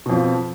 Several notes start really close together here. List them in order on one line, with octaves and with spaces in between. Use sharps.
B2 F2 F3